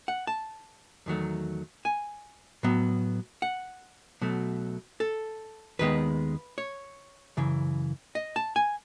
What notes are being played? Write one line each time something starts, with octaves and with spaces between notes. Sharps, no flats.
F#5
A5
E2 D#3 F#3 A3
G#5
A2 F#3 B3
F#5
B1 B2 F#3 A3
A4
D#2 D#3 G#3 B3 B4
C#5
F#2 C#3 E3
D#5
A5
G#5